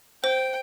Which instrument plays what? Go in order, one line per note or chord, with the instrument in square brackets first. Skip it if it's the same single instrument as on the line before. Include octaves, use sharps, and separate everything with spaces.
[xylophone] C5 [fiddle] G5